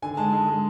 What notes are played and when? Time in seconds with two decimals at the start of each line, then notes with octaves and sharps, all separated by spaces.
0.02 D3 G#5
0.17 G#3 A5
0.33 G#3
0.48 G#3